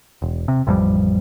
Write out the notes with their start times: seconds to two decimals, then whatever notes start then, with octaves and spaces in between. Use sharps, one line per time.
0.22 E1
0.48 C3
0.67 A1 F2 G3